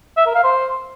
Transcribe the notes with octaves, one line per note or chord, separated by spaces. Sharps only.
E5
A#4
F5
C5